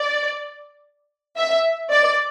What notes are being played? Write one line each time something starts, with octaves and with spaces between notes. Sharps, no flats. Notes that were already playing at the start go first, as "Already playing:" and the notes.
Already playing: D5
E5
D5